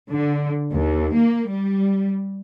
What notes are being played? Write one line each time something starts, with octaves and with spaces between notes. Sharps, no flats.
D3
D#2
A#3
G3